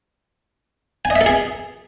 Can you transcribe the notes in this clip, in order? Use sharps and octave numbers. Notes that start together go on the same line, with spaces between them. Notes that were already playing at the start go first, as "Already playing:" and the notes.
G#5
D#5
E5
A4
G#4